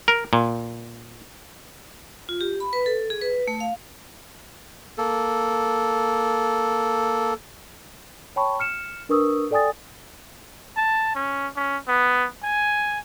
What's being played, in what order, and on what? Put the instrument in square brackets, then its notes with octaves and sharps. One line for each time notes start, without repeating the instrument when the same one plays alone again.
[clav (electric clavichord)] A#4
A#2
[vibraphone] F4
G4
B5
B4
A4
G#4
B4
A3
F5
[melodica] A#3 A4
[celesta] C#5 G5 A5 B5 C#6
F6 C#7 E7
D4 A#4 B4 C#6 D#6 E6
A4 D5 G5 G#5 D#6 A6
[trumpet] A5
C#4
C#4
B3
G#5